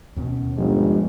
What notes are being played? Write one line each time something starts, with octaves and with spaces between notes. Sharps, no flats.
D#2 B2 C#4
G1 F3 G#3